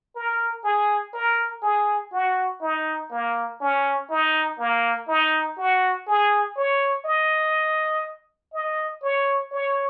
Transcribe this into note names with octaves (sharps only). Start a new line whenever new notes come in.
A#4
G#4
A#4
G#4
F#4
D#4
A#3
C#4
D#4
A#3
D#4
F#4
G#4
C#5
D#5
D#5
C#5
C#5